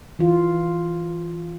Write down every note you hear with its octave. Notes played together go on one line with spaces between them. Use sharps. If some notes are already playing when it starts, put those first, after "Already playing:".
E3 F4